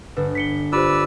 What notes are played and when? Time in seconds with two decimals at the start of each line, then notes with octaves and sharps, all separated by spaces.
0.17 G1 B4
0.35 B6 C#7 G7
0.72 F4 G4 B4 C5 D5 E6